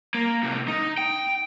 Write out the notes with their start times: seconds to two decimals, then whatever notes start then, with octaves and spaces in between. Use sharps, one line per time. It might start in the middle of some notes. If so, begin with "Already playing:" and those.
0.15 A#3
0.43 A2 C3
0.68 D#4
0.98 G5